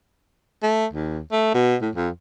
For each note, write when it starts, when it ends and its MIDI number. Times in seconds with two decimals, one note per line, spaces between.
0.63 0.86 57
0.93 1.19 39
1.32 1.54 57
1.54 1.76 47
1.82 1.90 45
1.95 2.09 41